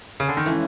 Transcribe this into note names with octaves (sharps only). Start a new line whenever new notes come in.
C#3
D3
D#3
A2 E3 F3 G#3 C#4